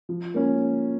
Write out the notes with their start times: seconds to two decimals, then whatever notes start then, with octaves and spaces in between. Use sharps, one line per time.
0.09 F3
0.34 A#3 C#4